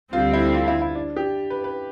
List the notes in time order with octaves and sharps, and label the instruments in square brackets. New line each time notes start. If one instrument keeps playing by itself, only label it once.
[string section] D2 D3 G3 C4 [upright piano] F4
[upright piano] E4
F4
E4
E4
D4
G4
B4
B4